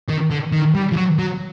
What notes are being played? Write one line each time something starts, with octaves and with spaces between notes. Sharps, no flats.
D#3
D3
D#3
G3
F3
F#3
F#3